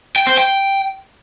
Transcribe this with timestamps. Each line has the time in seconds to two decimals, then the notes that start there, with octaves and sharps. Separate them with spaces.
0.16 G5
0.27 C5
0.38 G5